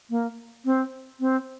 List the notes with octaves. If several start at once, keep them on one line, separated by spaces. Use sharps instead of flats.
A#3
C4
C4